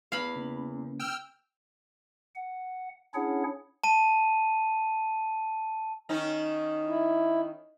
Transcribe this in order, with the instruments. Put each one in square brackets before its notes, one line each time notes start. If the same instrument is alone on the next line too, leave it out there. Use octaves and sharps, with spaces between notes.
[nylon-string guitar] E2 [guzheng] F5 B5
[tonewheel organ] C#3 A#3 C#4
[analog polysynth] G5 E6 F6
[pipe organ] F#5
C#4 D4 E4 G#4 C#5 F#5
[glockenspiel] A5 D#7
[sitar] D#3 C#4 D#4
[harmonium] E4